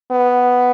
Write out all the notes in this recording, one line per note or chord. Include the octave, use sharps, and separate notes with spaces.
B3